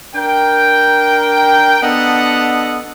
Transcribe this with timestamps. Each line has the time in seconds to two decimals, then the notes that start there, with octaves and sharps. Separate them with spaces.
0.15 D4 A#4 G5
1.83 B3 D4 A4 D#5 F#5